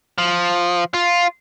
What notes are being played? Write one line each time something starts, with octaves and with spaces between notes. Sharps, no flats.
F3
F4